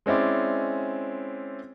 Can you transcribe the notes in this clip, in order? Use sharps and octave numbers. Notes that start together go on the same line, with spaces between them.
G#3 C4 C#4 E4 D5